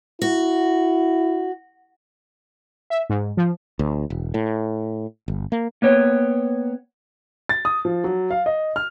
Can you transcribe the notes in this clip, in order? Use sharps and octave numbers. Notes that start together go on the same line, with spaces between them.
E4 F#4
E5
G#2
F3
D2
E1
A2
G1
A#3
A#3 B3 C#5 G5
A6
D#6
F3
F#3
F5
D#5
F6